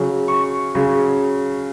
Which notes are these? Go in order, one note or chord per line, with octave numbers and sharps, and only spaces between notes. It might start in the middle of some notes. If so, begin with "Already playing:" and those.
Already playing: C#3 F#3
C#6
C#3 F#3